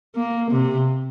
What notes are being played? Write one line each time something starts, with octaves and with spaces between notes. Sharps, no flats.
A#3
C3